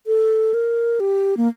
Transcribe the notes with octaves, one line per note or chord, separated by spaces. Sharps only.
A4
A#4
G4
A#3